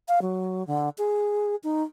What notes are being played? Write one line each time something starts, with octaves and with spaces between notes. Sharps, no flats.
F5
F#3
D3
G#4
D#4